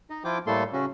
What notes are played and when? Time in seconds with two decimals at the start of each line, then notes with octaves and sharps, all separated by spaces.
0.10 D#4 D#5
0.24 F3 E4 F4 G5 D6
0.47 A2 G3 A3 A#3 A4 C6
0.73 C#3 C#4 F#4